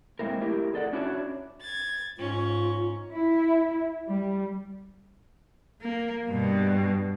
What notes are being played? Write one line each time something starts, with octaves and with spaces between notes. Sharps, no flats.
G#3 A#3 C4 E4 A#4
A3 E4 G4 A#4
G#4 A4 D5 F#5
C#4 D4 E4 F#4 C#5
G#6 A6
G#2 C#4 F4
E4
G3
A#3
G2 B2